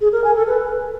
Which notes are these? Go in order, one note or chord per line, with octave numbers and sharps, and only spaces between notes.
G#4
A#4
G#5
A4
B4